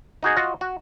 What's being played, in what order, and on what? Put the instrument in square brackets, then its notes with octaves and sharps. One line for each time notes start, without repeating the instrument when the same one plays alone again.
[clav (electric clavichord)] D#4 F#4 G#4 D#5
F4 F#4 D#5
F#4